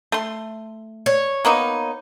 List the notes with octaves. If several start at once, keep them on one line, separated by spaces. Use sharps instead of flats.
A3 C6
C#5
A#3 B3 D#4